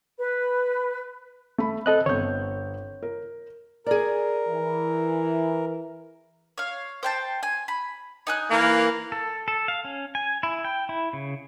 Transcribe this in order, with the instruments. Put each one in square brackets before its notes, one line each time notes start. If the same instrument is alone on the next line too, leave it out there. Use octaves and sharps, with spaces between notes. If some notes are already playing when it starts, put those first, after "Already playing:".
[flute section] B4
[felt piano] A3 B5
[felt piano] C4 [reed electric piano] A4 D#5 F#6
[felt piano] G1 C4 G6 [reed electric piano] C#5
[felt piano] A#4
[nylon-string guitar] G#4 D5 [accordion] A#4
[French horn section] E3
[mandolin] C#5 F5
C5 G5 A5
G#5
B5
D#4 G#5 F#6
[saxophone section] E3 A#3
[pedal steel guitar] A4
A4
F5
C#4
G#5
E4
G5
E4
C#3